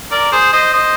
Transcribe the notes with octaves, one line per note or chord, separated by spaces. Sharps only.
A#4 D5
G#4 C5
C5 D#5
C5 D#5